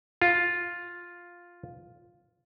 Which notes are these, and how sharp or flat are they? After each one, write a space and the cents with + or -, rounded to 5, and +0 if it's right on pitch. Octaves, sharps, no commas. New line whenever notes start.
F4 +5